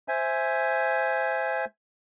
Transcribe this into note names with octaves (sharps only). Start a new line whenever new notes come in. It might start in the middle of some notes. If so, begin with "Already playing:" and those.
C5 E5 G#5